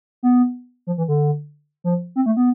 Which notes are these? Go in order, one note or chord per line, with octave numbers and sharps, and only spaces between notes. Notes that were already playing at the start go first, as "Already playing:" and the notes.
B3
F3
E3
D3
F3
C4
A3
B3